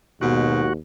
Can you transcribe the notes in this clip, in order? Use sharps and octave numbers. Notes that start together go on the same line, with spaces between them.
D#2 G#2 B2 F#4